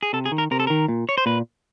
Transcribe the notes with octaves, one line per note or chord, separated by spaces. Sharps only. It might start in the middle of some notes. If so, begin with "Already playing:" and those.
G#4
C3 A4
G#4
D#3
A#4
C3 A#4
A4
D#3 A#4
A#2
C#5
C5
A#2 B4